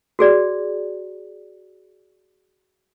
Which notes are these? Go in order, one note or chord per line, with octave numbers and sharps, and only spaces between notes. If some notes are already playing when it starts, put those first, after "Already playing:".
F#4 G#4 D5